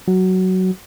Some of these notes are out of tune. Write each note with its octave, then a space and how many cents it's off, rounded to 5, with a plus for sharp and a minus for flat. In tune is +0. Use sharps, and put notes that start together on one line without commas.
F#3 +10